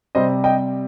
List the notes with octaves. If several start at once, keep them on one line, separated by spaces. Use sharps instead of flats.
C3 G3 C5 D#5
D#5 G5